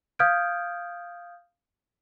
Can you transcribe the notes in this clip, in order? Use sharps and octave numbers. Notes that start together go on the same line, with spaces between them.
F5 D#6 F6 G6 G#6 D7